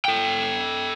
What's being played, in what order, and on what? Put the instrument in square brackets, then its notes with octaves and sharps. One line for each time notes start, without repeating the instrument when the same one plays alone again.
[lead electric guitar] A4 G5